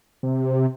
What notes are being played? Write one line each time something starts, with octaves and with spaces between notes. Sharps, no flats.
C3